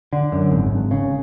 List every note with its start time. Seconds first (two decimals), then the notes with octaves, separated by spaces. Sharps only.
0.13 D3
0.32 F#2
0.51 G#1
0.72 G#1
0.91 C#3